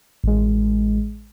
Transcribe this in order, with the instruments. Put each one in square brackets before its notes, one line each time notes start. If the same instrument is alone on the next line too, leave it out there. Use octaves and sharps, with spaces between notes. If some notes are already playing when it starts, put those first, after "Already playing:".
[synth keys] A1 G#3